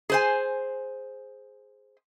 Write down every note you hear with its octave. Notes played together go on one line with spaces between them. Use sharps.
G#4 C5 G#5